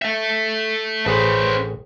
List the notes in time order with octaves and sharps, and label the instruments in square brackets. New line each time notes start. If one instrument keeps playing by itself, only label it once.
[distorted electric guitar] A4 E5
[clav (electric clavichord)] A1 G#4 [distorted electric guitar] C#4 B4 [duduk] C5